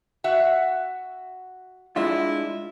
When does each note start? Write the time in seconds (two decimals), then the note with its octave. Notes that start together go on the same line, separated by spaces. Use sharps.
0.24 F#4 E5 F#5
1.96 G#3 D4 E4 F4